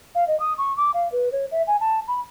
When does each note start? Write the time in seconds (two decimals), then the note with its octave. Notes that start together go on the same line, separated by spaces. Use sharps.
0.15 F5
0.28 D#5
0.40 D#6
0.58 C#6
0.77 D6
0.94 F5
1.12 B4
1.32 C#5
1.51 E5
1.67 G#5
1.80 A5
2.08 B5